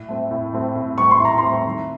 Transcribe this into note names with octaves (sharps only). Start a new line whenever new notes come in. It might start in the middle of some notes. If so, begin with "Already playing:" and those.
Already playing: A2
A3 C4
A2
A3 C4
A2
A3 C4 C#6
C6
A2 A#5
C6
A3 C4
D#3